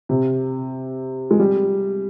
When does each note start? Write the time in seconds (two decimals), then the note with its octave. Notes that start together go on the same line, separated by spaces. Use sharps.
0.09 C3
1.31 G#3
1.39 G3